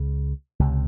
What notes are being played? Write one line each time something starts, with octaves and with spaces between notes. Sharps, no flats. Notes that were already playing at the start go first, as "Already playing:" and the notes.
Already playing: C#2 C#3
C#2 C3